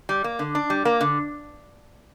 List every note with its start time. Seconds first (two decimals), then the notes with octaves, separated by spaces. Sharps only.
0.09 G3
0.24 A#3
0.39 D3
0.55 D4
0.70 G3
0.85 A#3
1.01 D3